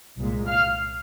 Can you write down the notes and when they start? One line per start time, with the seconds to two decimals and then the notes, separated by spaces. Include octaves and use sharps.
0.18 C2 A#2 G#3
0.47 F5 F6